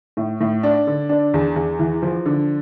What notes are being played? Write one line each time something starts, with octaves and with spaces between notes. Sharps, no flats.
A2
A2
D4
D3
D4
E2
E2
E3
F3
D3